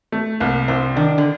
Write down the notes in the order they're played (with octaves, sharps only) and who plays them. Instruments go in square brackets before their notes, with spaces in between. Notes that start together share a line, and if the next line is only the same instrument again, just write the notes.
[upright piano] A3
[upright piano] C2 [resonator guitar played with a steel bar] A#3
[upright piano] C2 [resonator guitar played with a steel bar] C4
[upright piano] D#3 [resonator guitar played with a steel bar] D4
[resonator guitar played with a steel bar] D3